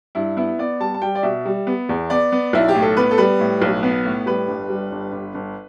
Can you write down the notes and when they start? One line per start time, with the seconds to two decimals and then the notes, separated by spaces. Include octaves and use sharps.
0.15 G2 E4
0.37 B3 E4
0.59 B3 D5
0.80 G3 A5
0.94 A5
1.01 G3 G5
1.15 D5
1.23 B2 E5
1.45 G3
1.67 B3
1.89 E2
2.10 B3 D5
2.32 B3
2.53 B1 E4
2.68 G4
2.75 A2
2.82 A4
2.97 B3 B4
3.11 A4
3.18 G3 B4
3.40 A2
3.62 B1
3.83 B3
4.05 A2
4.26 G3 B4
4.48 G1
4.70 G3
4.92 G1
5.12 G1
5.34 G1